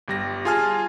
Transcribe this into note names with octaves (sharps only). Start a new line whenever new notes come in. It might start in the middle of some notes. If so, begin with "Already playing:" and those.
G1 G3 A#6
F4 G#4 G#5 A5 F6